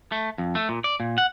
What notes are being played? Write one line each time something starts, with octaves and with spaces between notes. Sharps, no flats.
A3
F2
A3
A#2
D5
A#2
F#5